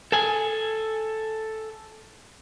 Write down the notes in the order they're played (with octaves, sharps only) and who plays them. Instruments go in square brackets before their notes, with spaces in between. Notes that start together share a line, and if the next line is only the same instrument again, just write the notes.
[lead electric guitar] A4 G#5